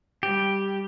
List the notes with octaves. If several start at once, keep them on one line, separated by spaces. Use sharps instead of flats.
G3 G4